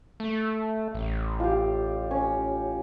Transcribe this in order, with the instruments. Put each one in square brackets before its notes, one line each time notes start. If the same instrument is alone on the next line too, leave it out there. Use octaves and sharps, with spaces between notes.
[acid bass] A3
A1
[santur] F4 G4
C#4